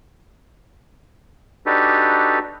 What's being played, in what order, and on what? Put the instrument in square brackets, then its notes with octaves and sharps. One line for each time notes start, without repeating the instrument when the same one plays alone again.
[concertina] D4 D#4 F#4 G4 A4 B4